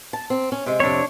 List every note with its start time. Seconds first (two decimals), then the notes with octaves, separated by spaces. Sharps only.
0.13 A5
0.30 C4
0.52 C#4
0.66 C3 G#3
0.80 F2 C3 D4 C#5